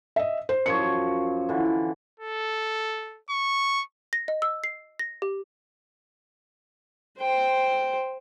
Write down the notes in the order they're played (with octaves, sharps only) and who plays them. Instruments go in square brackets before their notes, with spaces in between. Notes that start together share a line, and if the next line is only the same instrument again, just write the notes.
[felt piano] D#5 E5
C5
[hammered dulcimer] F#2 F3 C#5 [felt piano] C#7
[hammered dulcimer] D3 E3
[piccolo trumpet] A4
C#6
[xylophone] A#6
D#5
E6
C7
A#6
G4
[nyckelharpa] C5 G5